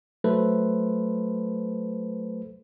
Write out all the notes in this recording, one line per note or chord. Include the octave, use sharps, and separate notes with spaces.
F#3 A3 A4 B4 C5